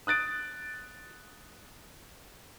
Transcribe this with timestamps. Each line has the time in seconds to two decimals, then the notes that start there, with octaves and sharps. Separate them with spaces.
0.07 D#6 F#6 A6 D7